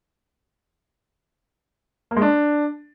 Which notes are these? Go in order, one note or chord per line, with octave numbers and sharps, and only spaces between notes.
A#3
G#3
D4